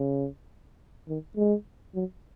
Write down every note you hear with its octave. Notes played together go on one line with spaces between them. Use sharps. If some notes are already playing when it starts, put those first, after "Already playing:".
Already playing: C#3
D#3
G#3
F#3